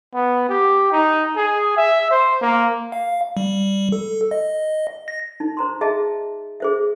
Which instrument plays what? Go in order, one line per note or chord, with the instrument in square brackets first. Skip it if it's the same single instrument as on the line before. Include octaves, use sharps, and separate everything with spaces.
[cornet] B3
G4
D#4
G#4
E5
C5
A#3
[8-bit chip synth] F5
G3
A4
D#5
A#6
[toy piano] D#4
C5 A#5 C6
G#4 D#5 E5 A5
G#4 C5 E5